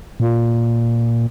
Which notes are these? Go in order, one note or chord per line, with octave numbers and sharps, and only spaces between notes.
A#2